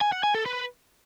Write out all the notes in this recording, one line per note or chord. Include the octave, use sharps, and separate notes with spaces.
G#5
F#5
G#5
A4
B4